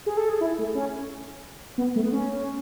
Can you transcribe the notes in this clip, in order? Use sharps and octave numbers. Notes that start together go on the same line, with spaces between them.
G#4
A4
G#4
E4
A3
C#4
B3
A3
B3
C#4